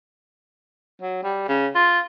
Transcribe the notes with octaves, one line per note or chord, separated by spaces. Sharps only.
F#3
G3
C#3
F4